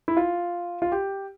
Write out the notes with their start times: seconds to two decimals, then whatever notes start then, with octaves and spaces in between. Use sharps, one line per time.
0.08 E4
0.17 F4
0.82 F4
0.92 G4